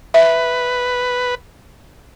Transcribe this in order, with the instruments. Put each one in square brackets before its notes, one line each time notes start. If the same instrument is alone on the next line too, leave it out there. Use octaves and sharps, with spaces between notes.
[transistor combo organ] B4 [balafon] E5